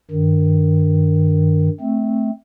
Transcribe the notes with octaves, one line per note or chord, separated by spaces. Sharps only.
G2 D#3
A3 C4